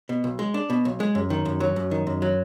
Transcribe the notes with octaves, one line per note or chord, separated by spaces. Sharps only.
B2
B1
G#3
D4
B2
B1
G#3
F#2
D#3
F#2
F#3
F#2
D#3
F#2
F#3